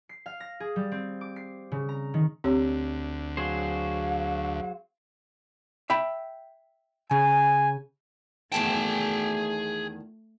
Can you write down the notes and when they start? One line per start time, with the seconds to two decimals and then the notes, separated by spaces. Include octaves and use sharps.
0.09 C7
0.26 F5
0.40 A#6
0.60 G#4
0.76 G3
0.92 C4
1.21 D6
1.36 C7
1.72 C#3
1.89 A#5
2.14 D#3
2.44 D2 C4 G4 C#5
3.37 F#3 G#4 C5 F5
5.90 E5 G5 B5
7.11 C#3 G#5
8.52 E2 D#3 A3 G#4 G5 A5